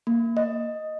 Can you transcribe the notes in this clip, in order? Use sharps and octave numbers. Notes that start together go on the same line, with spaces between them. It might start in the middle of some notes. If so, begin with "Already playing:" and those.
A#3
D#5